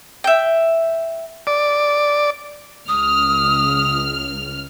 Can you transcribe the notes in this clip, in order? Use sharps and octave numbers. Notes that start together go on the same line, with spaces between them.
E5 G5
D5
C#2 D#6 F6